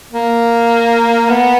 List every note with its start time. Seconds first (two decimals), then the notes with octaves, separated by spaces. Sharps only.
0.13 A#3
1.30 B3